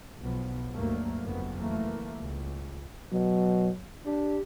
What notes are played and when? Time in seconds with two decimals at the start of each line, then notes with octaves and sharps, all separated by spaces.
0.20 B1 F3 B3
0.74 D2 G2 F#3 A3 A#3
1.24 F#1 F2 B3
1.59 E3 A3 A#3
2.17 C#2
3.12 B2 F#3
4.06 D4 G4